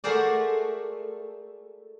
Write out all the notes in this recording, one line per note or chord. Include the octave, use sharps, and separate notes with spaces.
A3 F#4 G#4 A#4 C5 D5